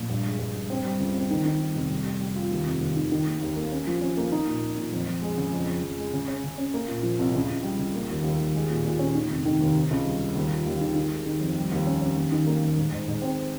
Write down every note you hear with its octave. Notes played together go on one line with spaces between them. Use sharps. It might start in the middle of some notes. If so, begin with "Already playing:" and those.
Already playing: A#1
G2
G#3
G2
G2
C4
G3
C#2
C4
D#3
D#3
G3
F1
G3
G3
G3
F4
D#2
F1
D#2
D#3
D#3
A#3
D#2
A#3
C#4
F3
C#4
A#3
D#4
A#2
A#2
A#2
F2
F2
G#3
C#3
F2
F2
F2
G#3
C#3
C#4
C#3
C#4
A#3
A#2
F3
C2
C#2
C#2
G3
C#2
A#3
D#2
D#2
D#2
G#3
A#2
A#2
C#4
D#3
F1
D#3
D#2
C3
C#2
G3
G3
D#2
F4
D#2
D#3
D#3
G#3
D#3
F2
G3
D#2
C#4
C#4
D#2
D#3
A#3
D#2
G#2
G#2
G#2
C4